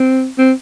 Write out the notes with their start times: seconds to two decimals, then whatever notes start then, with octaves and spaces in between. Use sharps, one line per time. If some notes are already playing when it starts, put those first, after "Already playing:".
Already playing: C4
0.38 C4